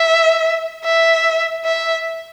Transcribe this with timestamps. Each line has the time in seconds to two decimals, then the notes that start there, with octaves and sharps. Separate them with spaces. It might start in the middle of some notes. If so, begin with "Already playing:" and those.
Already playing: E5
0.85 E5
1.65 E5